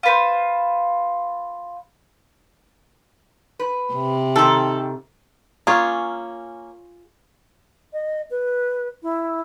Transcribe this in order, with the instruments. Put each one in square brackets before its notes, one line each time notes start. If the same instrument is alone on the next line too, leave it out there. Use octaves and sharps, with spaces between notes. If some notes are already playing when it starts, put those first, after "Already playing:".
[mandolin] F4 B4 C5
[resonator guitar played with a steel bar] B4
[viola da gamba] C3
[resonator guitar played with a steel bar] G#2 D#3 [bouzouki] A4
[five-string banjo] A#3 C#4 [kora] F4 G#4 C#5
[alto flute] D#5
B4
E4